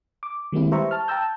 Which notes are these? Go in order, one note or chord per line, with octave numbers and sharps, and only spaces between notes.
D6
D#3 G3 G#3 A#3 C4 E4
G4 B4 C5 E5 A#5 C#6
A5 F6
G5 A5 A#5 E6 G6